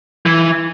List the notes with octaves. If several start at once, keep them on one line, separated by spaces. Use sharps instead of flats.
E3